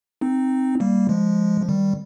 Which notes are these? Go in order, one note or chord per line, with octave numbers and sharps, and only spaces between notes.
C4 D#4
G3 A#3
F3 G#3
F3
D#3 G3